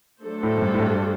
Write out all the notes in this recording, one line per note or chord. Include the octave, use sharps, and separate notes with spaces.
F#3 A3 D4 A4 C5
A2
F#2
G2
A2
G2